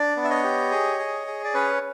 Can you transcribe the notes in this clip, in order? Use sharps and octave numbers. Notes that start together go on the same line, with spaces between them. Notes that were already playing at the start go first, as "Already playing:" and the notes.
Already playing: D4 D5
B3
E5
C#5 D#5
G4
G#4
G#4
G#4
D5
C#4 B4 C#5